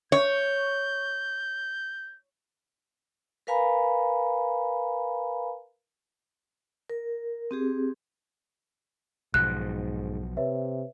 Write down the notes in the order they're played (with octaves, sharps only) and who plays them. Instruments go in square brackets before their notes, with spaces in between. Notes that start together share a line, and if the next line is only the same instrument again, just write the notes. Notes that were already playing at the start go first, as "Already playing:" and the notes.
[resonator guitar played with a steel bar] C#5 [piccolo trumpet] G6
[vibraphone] A#4 B4 F5 G#5 A#5 B5
A#4
C4 G4 G#4
[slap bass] B1 B2 F3 [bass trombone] G#2 [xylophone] F#6
[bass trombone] C3 [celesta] B4 C#5 E5